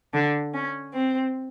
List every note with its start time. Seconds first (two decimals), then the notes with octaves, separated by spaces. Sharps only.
0.13 D3 D4
0.54 C#4
0.94 C4